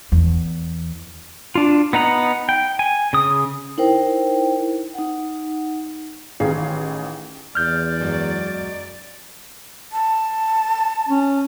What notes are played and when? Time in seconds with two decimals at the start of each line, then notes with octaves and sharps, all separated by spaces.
0.12 E2
1.55 D4 F4
1.93 B3 D#4 F#5 A#5
2.49 G5
2.79 G#5
3.13 C#3 D#6
3.78 D#4 E4 A#4 C5 G5
4.94 D#4 F#5
6.40 A1 D#3 G#4 F5 C7
7.55 E2 D5 F6 G6
8.00 F#2 F#3 G#3
9.92 A5
11.09 C#4